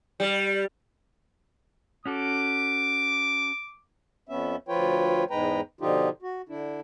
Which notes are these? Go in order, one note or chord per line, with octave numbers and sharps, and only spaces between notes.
G3
C#4 F#4 A4 D6
F2 B3 C#4 E5
D2 F3 F4 B4 C#5 G5
E2 G#2 G#3 B4 G5 A#5
B2 D3 F3 D#4 F4 G4
F#4
D3 D4 E4